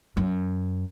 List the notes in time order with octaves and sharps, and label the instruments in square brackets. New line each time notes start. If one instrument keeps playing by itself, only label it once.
[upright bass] F#2